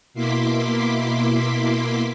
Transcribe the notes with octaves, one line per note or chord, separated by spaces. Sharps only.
B2 A#3 E4 C6 D6 B6